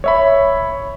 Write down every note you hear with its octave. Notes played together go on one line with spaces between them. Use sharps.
C#5 E5 B5